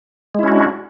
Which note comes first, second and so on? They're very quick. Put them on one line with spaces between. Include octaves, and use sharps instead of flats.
G#3 E4 C#4 F#4 D4